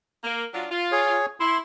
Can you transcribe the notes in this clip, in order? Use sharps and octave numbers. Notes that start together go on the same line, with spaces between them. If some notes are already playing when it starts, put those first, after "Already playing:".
A#3
F#3 D4 F4
F4
G#4 C#5
E4 C6